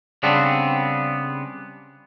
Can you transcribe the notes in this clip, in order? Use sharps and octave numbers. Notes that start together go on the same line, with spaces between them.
C#3 G3 B3 C4 D4